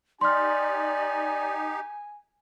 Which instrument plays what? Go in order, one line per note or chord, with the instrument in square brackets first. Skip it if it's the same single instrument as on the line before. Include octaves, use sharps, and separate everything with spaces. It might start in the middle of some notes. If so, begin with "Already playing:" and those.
[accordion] D#4 G4 [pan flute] D5 [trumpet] G#5 [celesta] C6 F6